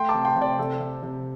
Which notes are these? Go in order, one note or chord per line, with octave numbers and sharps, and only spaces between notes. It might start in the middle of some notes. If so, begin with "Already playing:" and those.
Already playing: A3 G5 C6
A5 D6
C3
G5 C6
C3
D5 G5
C3 A4
C3
C3